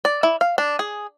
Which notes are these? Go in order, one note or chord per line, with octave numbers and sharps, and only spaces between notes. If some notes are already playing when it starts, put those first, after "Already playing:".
D5
E4
F5
D4
G#4